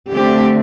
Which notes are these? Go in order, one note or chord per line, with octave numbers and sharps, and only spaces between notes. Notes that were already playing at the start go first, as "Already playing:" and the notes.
D3 A3 C4 G4